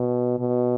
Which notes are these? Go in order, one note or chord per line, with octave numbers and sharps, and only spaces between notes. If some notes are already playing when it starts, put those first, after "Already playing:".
Already playing: B2
B2